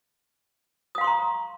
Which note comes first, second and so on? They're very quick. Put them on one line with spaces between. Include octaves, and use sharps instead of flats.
D#6 F5 C6 C#6 A#5